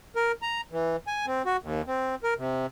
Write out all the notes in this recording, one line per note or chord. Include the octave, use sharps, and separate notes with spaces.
A#4
A#5
E3
G#5
C4
F#4
D#2
C4
A#4
C3